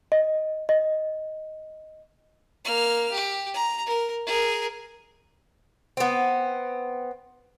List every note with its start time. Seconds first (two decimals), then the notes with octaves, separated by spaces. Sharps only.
0.12 D#5
0.69 D#5
2.64 A#3 F6
3.12 G4
3.54 A#5
3.86 A#4
4.26 G#4 A#4
5.97 B3 C4